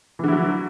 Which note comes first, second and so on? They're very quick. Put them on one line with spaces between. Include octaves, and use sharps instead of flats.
E3 D3 E4 F#3